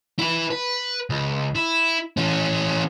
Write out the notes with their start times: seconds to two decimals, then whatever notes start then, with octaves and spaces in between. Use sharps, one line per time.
0.19 E4 B4
0.50 B4
1.10 C#2
1.55 E4
2.17 E3 C#4